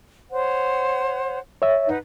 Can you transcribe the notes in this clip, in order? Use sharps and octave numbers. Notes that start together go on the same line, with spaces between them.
C5 C#5 F#5
C#5 E5
D#4 B4 F#5